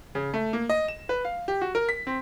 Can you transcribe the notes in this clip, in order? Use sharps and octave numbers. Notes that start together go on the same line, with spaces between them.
C#3
A3
A#3
D#5
E7
B4
F5
G4
F#4
A#4
B6
C4